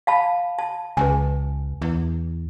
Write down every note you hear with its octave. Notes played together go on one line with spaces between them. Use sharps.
F5 A5 B5
A5
C#2 B4 G#5
E2